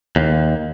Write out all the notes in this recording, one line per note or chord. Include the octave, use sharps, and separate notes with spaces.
D#2